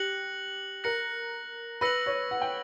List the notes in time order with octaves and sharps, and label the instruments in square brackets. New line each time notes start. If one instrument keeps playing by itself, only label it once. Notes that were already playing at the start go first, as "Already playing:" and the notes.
Already playing: [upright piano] G4 [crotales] F#6 A#6 C#7 F#7
[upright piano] A#4 [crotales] F#6 A#6 C#7 F#7
[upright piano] B4 [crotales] E6 A#6 C#7 F#7
[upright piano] C#5
F#5
G5